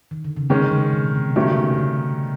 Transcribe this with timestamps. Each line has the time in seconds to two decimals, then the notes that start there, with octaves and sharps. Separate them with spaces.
0.11 D#3
0.24 D3
0.37 C#3
0.49 C3 D#3 G#3 C#4
0.66 D3
0.72 C#3
0.93 B2
1.05 B2
1.15 C3
1.36 G2 C3 D#3 F#3 A3 C#4
1.47 C#3
1.58 C3
1.74 C#3
1.78 D3